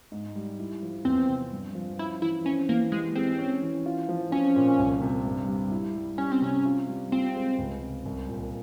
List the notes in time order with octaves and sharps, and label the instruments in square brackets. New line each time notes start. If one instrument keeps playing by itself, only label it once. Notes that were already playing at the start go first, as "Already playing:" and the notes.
[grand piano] G#2
G3
E4
F3
[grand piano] E2 [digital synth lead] C4
[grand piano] C3
G2
F3
[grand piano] C#4 [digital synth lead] E4
[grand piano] E3 [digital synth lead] E4
[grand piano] C4 [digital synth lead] C#4
[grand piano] E3 [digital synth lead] A#3
[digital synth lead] G#3 [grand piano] G4
[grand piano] G#3 [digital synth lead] C4
[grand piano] C#4
E3
F4
F3
[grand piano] C4 [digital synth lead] C#4
[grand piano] A#2
C2
C3
G2
G3
E4
G3
[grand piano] G3 [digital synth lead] C#4
[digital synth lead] C4
[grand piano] C3 [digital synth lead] C#4
[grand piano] F4
G3
[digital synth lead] C4 [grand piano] F4
[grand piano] G#3
C#2
C3
C2
A#2